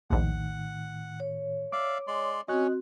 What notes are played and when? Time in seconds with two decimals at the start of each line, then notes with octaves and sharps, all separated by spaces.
0.10 A#1 D#2 A2 D#3 F#5
1.20 C#5
1.72 D5 E5 F5 D6
2.07 G#3 D5 C6
2.48 C4 C#4 F#4 C#5 D#5 F#6